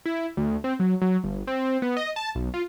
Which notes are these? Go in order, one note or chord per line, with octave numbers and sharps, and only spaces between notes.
E4
D2
C4
F#3
F#3
G1
C4
B3
D#5
A5
B1
F4